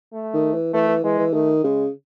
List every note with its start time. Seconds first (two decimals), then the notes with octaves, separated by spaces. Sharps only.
0.13 A3
0.34 D#3
0.54 E3
0.74 E3 A3
0.88 E3
1.04 E3 G#3
1.18 E3
1.33 D#3 A3
1.64 C#3 G#3